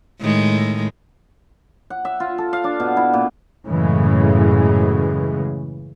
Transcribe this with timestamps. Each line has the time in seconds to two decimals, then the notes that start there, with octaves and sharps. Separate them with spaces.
0.20 A2 D#3 G#3
1.90 F#5
2.05 E5
2.20 F4
2.38 A4
2.53 F5
2.64 D4
2.80 B2
2.97 E4
3.13 A#2
3.66 F#2 A2 C#3 E3 G#3